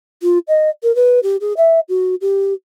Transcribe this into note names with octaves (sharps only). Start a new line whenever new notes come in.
F4
D#5
A#4
B4
G4
G#4
E5
F#4
G4